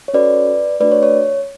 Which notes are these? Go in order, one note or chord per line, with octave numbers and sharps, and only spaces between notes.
C#5
C#4 F#4 A4 B4 D5
A3 D4 F#4 B4 D5
C#5
C#5